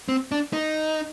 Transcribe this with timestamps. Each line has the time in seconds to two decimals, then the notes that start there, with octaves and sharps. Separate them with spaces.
0.09 C4
0.32 D4
0.53 D#4